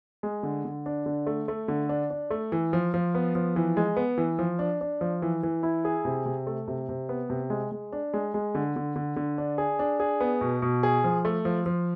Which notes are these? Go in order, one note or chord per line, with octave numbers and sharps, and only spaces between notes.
G#3
D3
D3
D4
D3
A3
A3
D3
D4
D4
A3
E3
F3
F3
B3
F3
E3
G#3
B3
E3
F3
D4
D4
F3
E3
E3
E4
G#4
C3
C3
A3
C3
C3
B3
C3
G#3
G#3
D4
G#3
G#3
D3
D3
D3
D3
D4
G#4
D4
G#4
B3
B2
B2
G#4
F3
A3
F3
F3